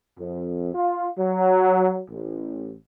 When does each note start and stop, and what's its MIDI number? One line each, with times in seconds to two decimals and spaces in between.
0.18 0.70 41
0.74 1.08 65
1.18 2.01 54
2.10 2.75 33